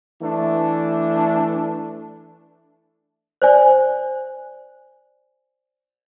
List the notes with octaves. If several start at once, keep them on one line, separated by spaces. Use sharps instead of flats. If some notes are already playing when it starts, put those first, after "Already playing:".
E3 A3 D4
C5 D5 G#5